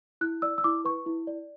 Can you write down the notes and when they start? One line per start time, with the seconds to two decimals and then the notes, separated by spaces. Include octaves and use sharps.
0.21 E4 F#6
0.42 D5 E6
0.58 E6
0.64 E4 D6
0.85 B4 C#6
1.06 E4
1.27 D5